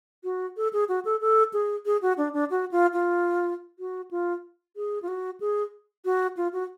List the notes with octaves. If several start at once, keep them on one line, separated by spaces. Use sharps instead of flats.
F#4
A4
G#4
F#4
A4
A4
G#4
G#4
F#4
D4
D4
F#4
F4
F4
F#4
F4
G#4
F4
F#4
G#4
F#4
F4
F#4